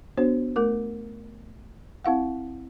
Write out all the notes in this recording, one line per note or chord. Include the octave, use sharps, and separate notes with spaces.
B3 D4 F#4 C5 C#5
A3 A#4 D6
C4 E4 F5 F#5